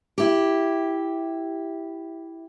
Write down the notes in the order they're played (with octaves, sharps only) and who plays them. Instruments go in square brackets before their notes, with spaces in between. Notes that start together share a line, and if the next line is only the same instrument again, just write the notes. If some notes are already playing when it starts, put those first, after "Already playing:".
[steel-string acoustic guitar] E4 G4